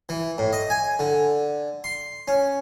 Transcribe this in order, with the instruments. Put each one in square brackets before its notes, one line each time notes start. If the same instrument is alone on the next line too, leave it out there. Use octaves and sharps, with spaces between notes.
[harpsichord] E3
A2
D#5
G#5
D3
C6
C#4